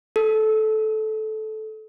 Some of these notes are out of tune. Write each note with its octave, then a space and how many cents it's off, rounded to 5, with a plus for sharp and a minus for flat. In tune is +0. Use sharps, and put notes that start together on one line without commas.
A4 -15